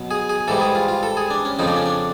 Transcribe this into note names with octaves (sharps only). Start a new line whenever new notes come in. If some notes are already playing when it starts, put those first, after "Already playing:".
Already playing: B2 F#3
G#4
G#4
G#2 E3 G3 A4
G#4
F4
F4
A4
G#4
D4
C#4
F2 C#3 F3 D#4
D4
C#4
D4